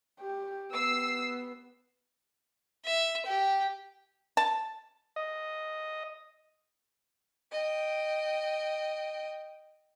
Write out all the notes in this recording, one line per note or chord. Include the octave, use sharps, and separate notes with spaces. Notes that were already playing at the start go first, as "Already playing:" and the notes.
G4
B3 E6 C7
E5
G4
A5
D#5
D#5 G5